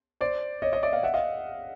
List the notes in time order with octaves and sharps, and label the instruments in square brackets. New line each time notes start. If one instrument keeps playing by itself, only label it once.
[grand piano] C5 D5
C#5 D#5
C#5 D#5
D5 E5
D#5 F5
E5 F#5
D#5 F5